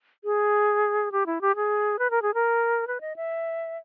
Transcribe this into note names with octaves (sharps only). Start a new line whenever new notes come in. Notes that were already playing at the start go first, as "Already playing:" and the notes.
G#4
G4
E4
G4
G#4
B4
A#4
G#4
A#4
B4
D#5
E5